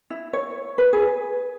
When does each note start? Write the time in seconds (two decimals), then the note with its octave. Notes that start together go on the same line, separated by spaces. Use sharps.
0.10 E4
0.33 C#5
0.78 B4
0.93 G#4